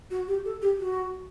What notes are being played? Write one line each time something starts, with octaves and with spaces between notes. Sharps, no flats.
F#4
G4
A4
G4
F#4